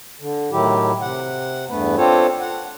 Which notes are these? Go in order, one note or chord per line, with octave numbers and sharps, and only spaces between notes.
D3
A2 D#3 F#3 E4 G4
C3 F#5
E2 G2 A3 B3 B4
C4 D4 F4 A4 C5 C#5
F#5